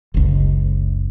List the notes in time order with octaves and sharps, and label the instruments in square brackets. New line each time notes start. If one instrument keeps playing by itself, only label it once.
[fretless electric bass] F#1 C#2